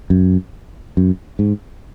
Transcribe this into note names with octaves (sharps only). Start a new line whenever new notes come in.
F#2
F#2
G#2